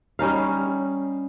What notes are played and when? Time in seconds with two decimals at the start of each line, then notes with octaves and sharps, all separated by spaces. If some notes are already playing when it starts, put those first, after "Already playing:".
0.19 G3 C#4 D#4 F5